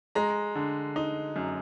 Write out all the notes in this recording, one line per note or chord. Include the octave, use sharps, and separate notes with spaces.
G#3 A#5
D3
D#4
F#2